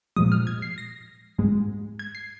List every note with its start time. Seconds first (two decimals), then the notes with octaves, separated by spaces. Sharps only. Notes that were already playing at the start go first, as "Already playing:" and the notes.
0.16 A#2 F3 G#3 D#6
0.32 F6
0.47 G#6
0.62 C7
0.78 A#6
1.38 G#2 G#3
1.99 G#6
2.15 C7